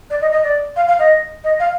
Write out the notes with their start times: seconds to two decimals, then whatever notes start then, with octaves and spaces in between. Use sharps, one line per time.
0.10 D5
0.21 D#5
0.32 D#5
0.43 D5
0.76 F5
0.88 F5
0.99 D#5
1.44 D#5
1.59 F5